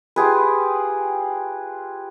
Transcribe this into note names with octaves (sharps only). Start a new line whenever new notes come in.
F4 G4 G#4 B4